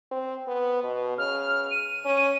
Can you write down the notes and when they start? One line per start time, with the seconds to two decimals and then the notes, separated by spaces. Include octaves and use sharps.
0.11 C4
0.47 B3
0.84 B2
1.18 C#3 F6
1.71 D#7
2.05 C#4